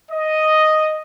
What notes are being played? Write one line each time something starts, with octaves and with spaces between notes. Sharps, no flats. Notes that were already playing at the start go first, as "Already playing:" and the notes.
D#5